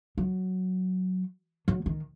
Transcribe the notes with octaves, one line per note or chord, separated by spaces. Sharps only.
F#3
F#3
D#3